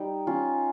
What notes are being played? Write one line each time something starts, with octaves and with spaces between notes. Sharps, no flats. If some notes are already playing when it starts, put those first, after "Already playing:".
Already playing: G3 D#4
C#4 F4